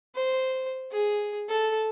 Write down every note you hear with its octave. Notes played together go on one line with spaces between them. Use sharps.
C5
G#4
A4